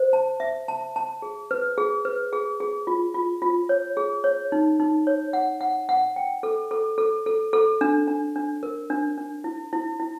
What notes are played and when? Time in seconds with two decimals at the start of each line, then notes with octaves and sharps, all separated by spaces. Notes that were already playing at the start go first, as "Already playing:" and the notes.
Already playing: C5
0.13 A5
0.40 E5
0.68 A5
0.96 A5
1.22 G#4
1.51 B4
1.78 G#4
2.05 B4
2.33 G#4
2.60 G#4
2.87 F4
3.14 F4
3.42 F4
3.69 C#5
3.97 G#4
4.24 C#5
4.52 D#4
4.79 D#4
5.07 C#5
5.33 F#5
5.61 F#5
5.89 F#5
6.16 G5
6.43 A4
6.71 A4
6.98 A4
7.26 A4
7.53 A4
7.81 D4
8.08 D4
8.36 D4
8.63 A#4
8.90 D4
9.17 D4
9.44 E4
9.73 E4
10.00 E4